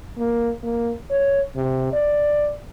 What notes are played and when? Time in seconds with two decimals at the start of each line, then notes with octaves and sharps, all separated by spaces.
0.18 A#3
0.63 A#3
1.11 C#5
1.56 C3
1.93 D5